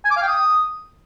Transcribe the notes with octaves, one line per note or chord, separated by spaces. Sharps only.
G#5
D6
F5
G5
D#6